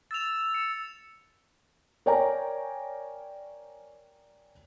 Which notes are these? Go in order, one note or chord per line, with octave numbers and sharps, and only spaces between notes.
E6 A6 F7
C#7
A#4 C#5 D5 G5 G#5 A#5